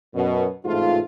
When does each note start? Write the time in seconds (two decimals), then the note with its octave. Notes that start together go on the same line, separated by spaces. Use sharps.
0.15 F#2 B2
0.65 A1 G#2 C3 A3 F4